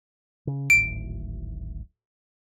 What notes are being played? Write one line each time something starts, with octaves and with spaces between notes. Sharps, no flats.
C#3
D1 G#1 A2 D7